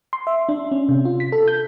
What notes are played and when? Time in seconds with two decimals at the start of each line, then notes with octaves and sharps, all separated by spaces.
0.13 C6
0.27 E5
0.49 D4
0.71 C#4
0.89 C3
1.05 F4
1.20 B6
1.32 A4
1.48 G6